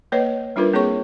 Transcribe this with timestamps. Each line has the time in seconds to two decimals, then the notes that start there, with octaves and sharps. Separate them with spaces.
0.12 A#3 B4 C#5 D#5
0.56 G3 D4 D#4 F4 A#4 B4
0.73 A#3 C4 G#4 C#5 C#6